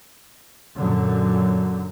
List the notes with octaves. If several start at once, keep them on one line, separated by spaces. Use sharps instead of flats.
F#2 A#2 D3 F#3